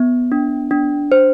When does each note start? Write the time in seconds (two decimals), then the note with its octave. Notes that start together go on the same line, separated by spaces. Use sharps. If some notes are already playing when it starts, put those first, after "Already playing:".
Already playing: B3
0.32 D4
0.71 D4
1.12 C5